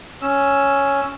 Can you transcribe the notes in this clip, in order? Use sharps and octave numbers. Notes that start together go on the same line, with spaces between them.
C#4 E6